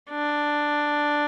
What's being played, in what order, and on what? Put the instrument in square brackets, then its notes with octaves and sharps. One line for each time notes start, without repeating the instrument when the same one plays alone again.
[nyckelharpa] D4